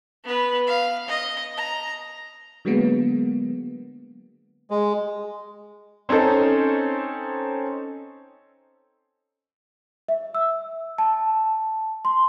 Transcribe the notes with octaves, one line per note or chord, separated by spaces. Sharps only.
B3 B4
F5
D#5
A#5
D3 F#3 G#3 A#3 B3
G#3
C4 C#4 D#4 A4 C5
E5
E6
A5
C6